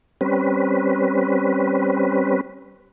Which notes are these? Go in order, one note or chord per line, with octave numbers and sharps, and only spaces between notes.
G3 C4 C#4 B4